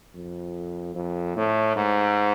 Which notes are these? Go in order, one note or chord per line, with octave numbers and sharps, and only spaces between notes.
F2
F2
A2
G#2